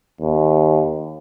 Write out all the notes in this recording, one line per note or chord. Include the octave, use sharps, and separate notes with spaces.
D#2